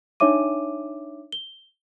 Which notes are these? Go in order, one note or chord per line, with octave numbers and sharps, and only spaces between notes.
D4 D#4 C#5 E5 D6 D#7
G7